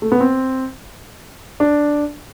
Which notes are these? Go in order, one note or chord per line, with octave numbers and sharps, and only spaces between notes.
A3
B3
C4
D4